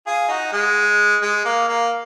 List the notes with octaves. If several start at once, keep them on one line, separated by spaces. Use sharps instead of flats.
F4 G#4
D#4 F#4
G#3
G#3
A#3
A#3